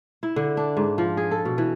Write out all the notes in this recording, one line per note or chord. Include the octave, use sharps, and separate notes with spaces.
E4
D3
D4
G#2
F3
G#4
A4
B2
E3